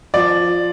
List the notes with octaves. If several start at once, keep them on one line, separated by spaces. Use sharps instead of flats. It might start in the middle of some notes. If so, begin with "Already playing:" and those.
F3 D5